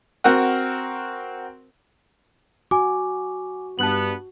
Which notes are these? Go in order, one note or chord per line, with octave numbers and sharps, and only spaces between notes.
C4 F#4 A#4 F#5
F#4 G#5 D6
G2 B3 A5 F#6 F#7